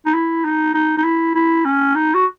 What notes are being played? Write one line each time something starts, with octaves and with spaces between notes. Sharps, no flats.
D#4
E4
D#4
D#4
D#4
E4
E4
C#4
D#4
F#4